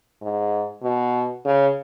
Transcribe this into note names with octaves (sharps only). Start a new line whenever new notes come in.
G#2
B2
C#3